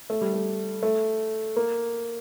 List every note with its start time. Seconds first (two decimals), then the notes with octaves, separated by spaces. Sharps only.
0.10 A3
0.21 G3
0.33 A3
0.83 A3
1.56 A#3